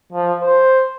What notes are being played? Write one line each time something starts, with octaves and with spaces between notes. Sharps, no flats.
F3
C5